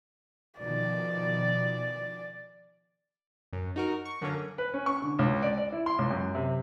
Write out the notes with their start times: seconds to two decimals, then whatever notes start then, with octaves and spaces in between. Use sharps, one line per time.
0.59 B2 D#3 F3 D5
3.53 F#2
3.76 D#4 F#4 A#4
4.05 C#6
4.21 F#2 D3 A#3 C#4
4.58 B4
4.74 C#4
4.86 C#6
5.02 D3
5.19 C#2
5.42 D5
5.57 D5
5.72 E4
5.86 C6
5.98 C#2
6.11 F#2
6.35 C3